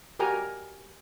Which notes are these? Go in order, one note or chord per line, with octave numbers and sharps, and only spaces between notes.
F#4 G4 A#4 G#5 A#5